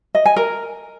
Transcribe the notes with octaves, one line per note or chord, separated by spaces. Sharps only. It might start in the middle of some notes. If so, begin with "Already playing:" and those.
D#5
G#5
A#4